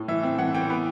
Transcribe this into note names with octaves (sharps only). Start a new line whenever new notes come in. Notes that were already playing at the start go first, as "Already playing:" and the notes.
Already playing: A2
E3 E5
C4
E3 F#5
E3 G5
B3